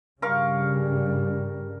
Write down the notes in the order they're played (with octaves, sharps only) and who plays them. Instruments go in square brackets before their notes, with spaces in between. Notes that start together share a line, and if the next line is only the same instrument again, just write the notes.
[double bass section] G2 C#3 G3 [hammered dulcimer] A#4 F5 C#6